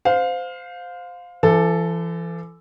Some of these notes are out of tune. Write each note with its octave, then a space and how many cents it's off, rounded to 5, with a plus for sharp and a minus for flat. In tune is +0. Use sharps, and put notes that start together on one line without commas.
C5 -20 F5 +20
E3 +40 A4 +0